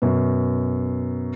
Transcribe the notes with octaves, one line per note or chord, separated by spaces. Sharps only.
F#2 B2